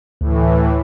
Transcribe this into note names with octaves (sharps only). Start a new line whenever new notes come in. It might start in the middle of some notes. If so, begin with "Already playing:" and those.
D2 A2 E3